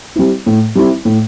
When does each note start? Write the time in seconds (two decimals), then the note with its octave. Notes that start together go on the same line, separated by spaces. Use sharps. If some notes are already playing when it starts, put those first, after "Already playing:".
0.16 G3 C4 E4
0.46 A2
0.75 G3 C4 E4
1.05 A2